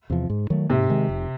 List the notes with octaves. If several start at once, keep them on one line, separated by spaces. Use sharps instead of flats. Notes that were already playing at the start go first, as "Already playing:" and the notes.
E2 C3 F3
G#2
D#3 F#3 A3
G#2 C3
D#3 G#3
F1